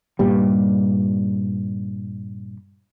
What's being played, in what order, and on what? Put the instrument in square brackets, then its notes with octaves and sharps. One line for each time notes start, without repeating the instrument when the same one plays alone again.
[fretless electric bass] G2 A#2 G3